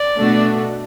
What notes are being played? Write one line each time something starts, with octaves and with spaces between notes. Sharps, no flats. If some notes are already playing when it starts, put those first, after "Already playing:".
Already playing: D5
B2 A3 D4 F#4